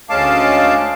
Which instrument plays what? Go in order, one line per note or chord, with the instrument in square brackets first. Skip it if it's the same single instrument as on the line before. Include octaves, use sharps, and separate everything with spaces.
[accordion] D2 G#3 C#4 F5 A5 D6